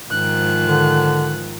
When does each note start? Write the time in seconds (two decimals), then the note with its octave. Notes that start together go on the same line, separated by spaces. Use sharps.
0.11 G#2 D#3 F3 F#6
0.63 D3